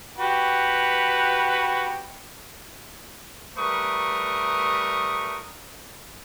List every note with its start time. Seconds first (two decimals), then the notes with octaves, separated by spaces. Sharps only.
0.18 F#4 G4 B4
3.57 G3 A3 A#4 B4 C#6 D#6